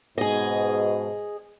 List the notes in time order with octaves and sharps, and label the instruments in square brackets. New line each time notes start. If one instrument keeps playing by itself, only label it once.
[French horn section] G#2 B2 [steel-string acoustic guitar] G#4 D#5